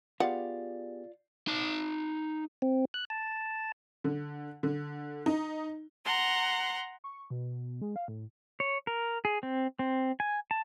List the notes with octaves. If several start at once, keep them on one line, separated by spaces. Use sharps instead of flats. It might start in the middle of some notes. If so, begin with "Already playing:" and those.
B3 F4 G4 G#4 D5 F5 F#5
D#4 A5
C4
F#6
A5
D3
D3
D#4
F#5 A#5 C6
C#6
B2
G#3
F5
A2
C#5
A#4
G#4
C4
C4
G#5
A5